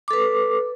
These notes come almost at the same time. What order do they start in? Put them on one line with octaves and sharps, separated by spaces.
D6 A4 B4